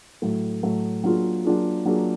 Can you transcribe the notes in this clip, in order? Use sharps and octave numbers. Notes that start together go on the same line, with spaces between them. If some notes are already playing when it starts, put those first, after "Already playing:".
A2 F#3 A3
A2 F#3 A3
F#3 A#3 D4 F4 G#4
F#3 A#3 D4 F4 G#4
F#3 A#3 D4 F4 G#4